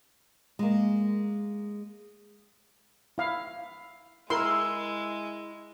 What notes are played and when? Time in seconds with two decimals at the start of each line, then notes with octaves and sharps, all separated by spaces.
0.59 G#3 A#3
3.18 E4 F5
4.30 G#3 E4 A#4 C6 E6